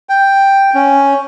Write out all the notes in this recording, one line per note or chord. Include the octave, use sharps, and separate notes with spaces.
G5
C#4